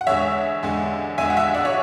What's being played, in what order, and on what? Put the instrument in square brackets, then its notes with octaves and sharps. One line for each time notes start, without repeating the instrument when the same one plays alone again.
[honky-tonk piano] F#5
E2 D3 G#3 C#5 E5
E2 D3 G#3
E2 D3 G#3 E5 G#5
F#5
E5 G#5
D5 F#5
C#5